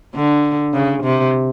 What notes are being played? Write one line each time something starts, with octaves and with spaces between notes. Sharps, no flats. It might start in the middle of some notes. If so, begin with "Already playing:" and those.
D3
C#3
C3